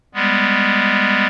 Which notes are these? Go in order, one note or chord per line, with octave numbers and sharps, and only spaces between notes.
G3 G#3 B3